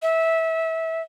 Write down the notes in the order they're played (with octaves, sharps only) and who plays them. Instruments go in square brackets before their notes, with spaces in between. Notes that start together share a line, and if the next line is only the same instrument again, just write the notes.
[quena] E5